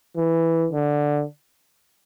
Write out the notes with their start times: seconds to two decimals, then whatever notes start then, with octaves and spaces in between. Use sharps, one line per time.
0.17 E3
0.73 D3